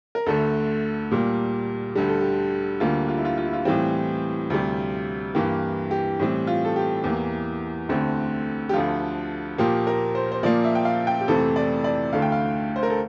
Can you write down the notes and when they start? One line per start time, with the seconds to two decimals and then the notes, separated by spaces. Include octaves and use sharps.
0.15 A#4
0.26 D2 D3 A3 A4
1.11 A#2 G3 A#3
1.95 D2 D3 G3 G4
2.09 A4
2.21 G4
2.80 D2 D3 G3 A#3 F4
3.08 F4
3.17 E4
3.25 F4
3.38 F4
3.45 E4
3.53 F4
3.65 A2 E3 G3 C4
4.50 D2 C3 G3
5.35 G2 E3 A#3 G4
5.91 G4
6.19 A2 E3 G3 C4
6.47 F4
6.65 A4
6.76 G4
7.04 E2 E3 A#3
7.89 D2 D3 A3 C4
8.69 G4
8.73 D2 D3 F3 F4
9.58 A#2 F3 A#3 G4
9.87 A#4
10.15 C5
10.32 C5
10.43 A#2 F3 A#3 D5
10.64 E5
10.75 G5
10.85 F5
11.07 G5
11.21 G4
11.28 F2 C3 E3 A3 C4 A4
11.56 D5
11.84 D5
12.13 D2 D3 A3 F5
12.22 G5
12.32 F5
12.76 C5
12.83 A#4
12.90 A4